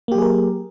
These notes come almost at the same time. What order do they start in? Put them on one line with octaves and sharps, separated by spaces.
A#3 G4 F#3 G#4 A#4